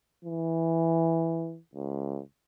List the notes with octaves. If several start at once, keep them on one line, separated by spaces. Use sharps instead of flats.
E3
C#2